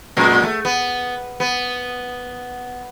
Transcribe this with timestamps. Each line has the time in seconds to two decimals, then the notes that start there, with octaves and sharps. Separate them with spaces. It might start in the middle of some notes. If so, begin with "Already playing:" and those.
0.17 F#2 A#2 G#3
0.43 A3
0.65 B3
1.40 B3